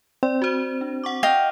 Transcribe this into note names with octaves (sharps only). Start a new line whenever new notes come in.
C4 D5
F#4 C5
D4
F#5 C#6 D6
D#5 F5 G5